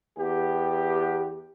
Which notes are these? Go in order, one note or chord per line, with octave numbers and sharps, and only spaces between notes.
E2 B3 G4